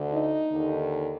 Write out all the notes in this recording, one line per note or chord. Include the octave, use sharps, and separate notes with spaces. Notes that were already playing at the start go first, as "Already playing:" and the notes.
Already playing: D2 D3
D#4
D#2 D3